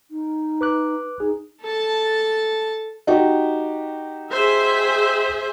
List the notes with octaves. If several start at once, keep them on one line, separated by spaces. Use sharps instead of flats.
D#4
B4 D6 F#6
D#4 G#4
A4 A5
D#4 F#4 G4
G#4 C5 E5